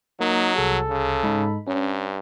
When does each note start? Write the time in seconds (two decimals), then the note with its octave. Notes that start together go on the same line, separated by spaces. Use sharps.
0.20 F#3 A#3 D#4
0.56 C2 G#4 A4
0.89 C#3
1.24 G#2 D#4 B5
1.67 G2 C#4